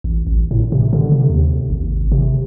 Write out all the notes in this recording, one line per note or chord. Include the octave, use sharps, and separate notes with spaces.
A1
A1
A2
C3
D3
C3
D#2
G#1
C3